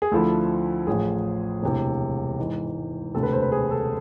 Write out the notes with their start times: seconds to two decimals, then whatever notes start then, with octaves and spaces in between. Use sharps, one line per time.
0.02 G#4
0.11 D2 D3 F3 A3 E4 A4
0.87 A1 A2 F3 G#4
1.63 E1 D2 C3 E3
2.38 G#2 E3 G#3
3.15 E1 D2 C3 A4
3.23 B4
3.33 C5
3.42 B4
3.52 G#4
3.71 A4